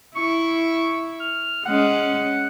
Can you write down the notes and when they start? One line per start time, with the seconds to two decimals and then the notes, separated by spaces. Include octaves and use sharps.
0.16 E4 C#6
1.20 F6
1.66 G#3 C#4 F#5